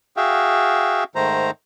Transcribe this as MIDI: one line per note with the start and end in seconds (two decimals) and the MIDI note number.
0.17 1.04 66
0.17 1.04 68
0.17 1.04 76
0.17 1.04 77
0.17 1.04 79
1.15 1.51 44
1.15 1.51 51
1.15 1.51 57
1.15 1.51 72
1.15 1.51 82